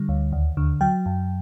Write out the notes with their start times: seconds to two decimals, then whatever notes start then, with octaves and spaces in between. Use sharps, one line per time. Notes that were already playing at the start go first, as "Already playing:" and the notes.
Already playing: D3 G3
0.09 D2
0.33 D#2
0.57 D3
0.81 F#3 G5
1.06 F#2